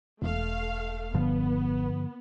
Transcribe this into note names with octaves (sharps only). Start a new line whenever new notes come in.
E1 A3 F5
G2 D3 F3 B3